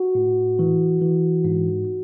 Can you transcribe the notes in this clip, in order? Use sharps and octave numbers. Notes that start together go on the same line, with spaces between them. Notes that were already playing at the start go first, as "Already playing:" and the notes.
Already playing: F#4
A2
E3
E3
G#2